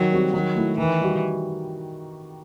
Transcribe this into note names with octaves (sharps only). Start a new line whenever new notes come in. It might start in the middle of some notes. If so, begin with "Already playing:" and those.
Already playing: D#3 F#3
G3 C4 F#4
D#3 F#3
A3 E4
D#3 E3
G3 D#4 F#4